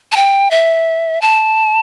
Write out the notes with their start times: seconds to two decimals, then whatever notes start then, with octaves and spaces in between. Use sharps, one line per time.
0.12 A5
0.16 G5
0.51 E5
1.22 A5